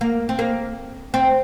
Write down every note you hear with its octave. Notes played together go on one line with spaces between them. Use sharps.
A#3
C4
A#3
C4